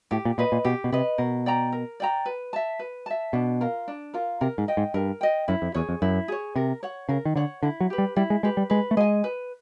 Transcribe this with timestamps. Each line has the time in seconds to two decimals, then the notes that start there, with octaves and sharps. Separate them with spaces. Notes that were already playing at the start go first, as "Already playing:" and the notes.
0.11 A2 G4
0.25 A#2
0.38 A#2 B4 D#5
0.52 A#2
0.64 B2 G4
0.84 B2
0.92 C3 B4 D#5
1.18 B2 A#4
1.46 D5 G5 A#5
1.72 A#4
2.00 D5 G5 A#5
2.26 B4
2.53 E5 A5
2.79 B4
3.06 E5 A5
3.33 B2 D4
3.61 F4 A#4
3.88 D4
4.14 F4 A#4
4.41 C3 A#4
4.58 G#2
4.68 D#5 G5
4.77 G#2
4.94 G2 A#4
5.21 D#5 G5
5.48 F#2 E4
5.62 F2
5.74 E2 G#4 C#5
5.89 F2
6.02 F#2 E4
6.28 G#4 C#5
6.56 C3 A#4
6.83 C#5 F#5
7.09 C#3 A#4
7.25 D#3
7.36 D3 C#5 F#5
7.63 D3 E4
7.80 F#3
7.90 G4 B4
7.98 G3
8.16 G3 E4
8.30 G#3
8.43 G#3 G4 B4
8.57 G3
8.70 G#3 B4
8.91 A3
8.97 G#3 D#5 G#5
9.24 B4